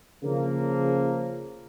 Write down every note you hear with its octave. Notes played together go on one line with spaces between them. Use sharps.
C#3 F3 A#3